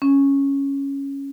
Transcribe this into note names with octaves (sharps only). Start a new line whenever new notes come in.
C#4